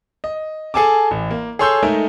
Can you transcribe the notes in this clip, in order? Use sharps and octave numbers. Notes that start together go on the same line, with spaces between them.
D#5
G#4 A4 G#5 A5 D6
A1
A#3
G#4 A4 C#5 C6 E6 G6
G#3 A3 D#4 A#4